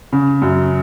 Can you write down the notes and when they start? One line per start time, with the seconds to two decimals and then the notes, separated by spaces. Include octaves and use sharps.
0.13 C#3
0.42 F#2